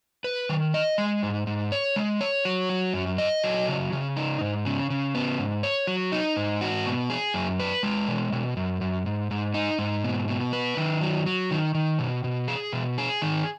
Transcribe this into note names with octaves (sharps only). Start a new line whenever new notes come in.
B4
D#3
D#5
G#3
G#2
G#2
C#5
G#3
C#5
F#3
F#4
F#2
D#5
F#3
C#3
C#3
D#4
G#2
C#3
C#3
B3
G#2
C#5
F#3
D#4
G#2
F#4
B2
G#4
F#2
B4
G#3
B2
B2
F#2
F#2
G#2
G#2
D#4
G#2
B2
B2
B4
D#3
F#3
F#3
D#3
D#3
B2
B2
G#4
B2
G#4
D#3